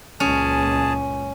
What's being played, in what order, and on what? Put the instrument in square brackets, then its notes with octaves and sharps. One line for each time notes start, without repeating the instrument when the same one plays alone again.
[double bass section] C#2 F#2 A#2 [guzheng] C#4 [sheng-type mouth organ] G#4 A5